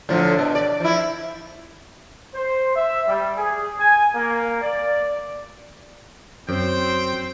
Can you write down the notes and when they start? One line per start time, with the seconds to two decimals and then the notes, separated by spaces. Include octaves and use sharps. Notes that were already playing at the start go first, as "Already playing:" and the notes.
0.09 A2 D3 F3
0.39 B2
0.55 D5
0.80 F3 E4
2.34 C5
2.76 E5
3.07 G3
3.37 G#4
3.80 G#5
4.15 A#3
4.62 D5
6.49 F#2 C4 C5 G5